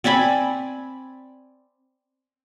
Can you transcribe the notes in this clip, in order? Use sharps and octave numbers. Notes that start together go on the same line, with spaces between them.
C4 D5 G#5 B5